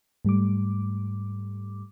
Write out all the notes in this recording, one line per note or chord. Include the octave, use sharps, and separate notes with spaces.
G#2 G3 A3 D6